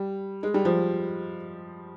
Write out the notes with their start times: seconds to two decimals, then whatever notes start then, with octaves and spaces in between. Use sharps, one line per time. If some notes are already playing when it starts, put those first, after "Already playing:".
Already playing: G3
0.43 G#3
0.54 G3
0.65 F3